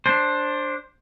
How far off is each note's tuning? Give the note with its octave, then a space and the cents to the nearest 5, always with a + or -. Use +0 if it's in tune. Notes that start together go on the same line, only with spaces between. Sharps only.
D4 +0 C5 +15